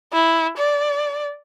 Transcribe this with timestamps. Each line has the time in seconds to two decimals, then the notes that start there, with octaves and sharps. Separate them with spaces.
0.13 E4
0.57 D5